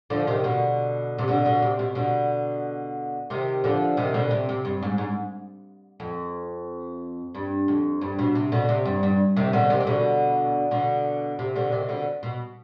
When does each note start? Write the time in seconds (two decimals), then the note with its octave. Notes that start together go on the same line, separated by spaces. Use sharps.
0.10 D3 F3
0.27 C3 D#3
0.44 B2 D3
1.18 C3
1.28 B2 D3
1.45 B2 D3
1.62 C3
1.79 B2
1.95 B2 D3
3.30 C3 D#3
3.64 D3 F3
3.97 C3 D#3
4.14 B2 D3
4.31 C3
4.49 C3
4.65 G2
4.82 G#2
4.98 G#2
6.00 F2
7.35 G2
7.68 F2
8.01 G2
8.19 B2
8.35 C3
8.52 B2 D3
8.69 C3
8.85 G2
9.03 G2
9.37 C3 D#3
9.53 B2 D3
9.70 C3 D#3
9.80 C3
9.87 B2 D3
10.71 B2 D3
11.39 C3
11.55 B2 D3
11.72 C3 D#3
11.89 B2 D3
12.23 B2